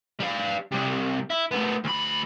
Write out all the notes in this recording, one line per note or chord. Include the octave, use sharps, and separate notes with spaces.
G3 F5
C3 G3
E4
A3 B3
D2 B5